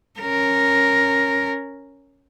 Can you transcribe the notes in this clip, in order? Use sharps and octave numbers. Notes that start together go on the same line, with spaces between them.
C#4 A#4